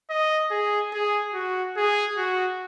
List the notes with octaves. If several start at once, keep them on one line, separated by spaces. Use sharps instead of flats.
D#5
G#4
G#4
F#4
G#4
F#4